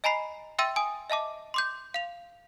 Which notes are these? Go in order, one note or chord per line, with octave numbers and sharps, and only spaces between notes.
D#5 G#5 A#5 B5 C7
E5 G5 C6 E6 A6 D#7
G#5 D#6
D#5 E5 A5 D6
C6 D6 G6
F5 F7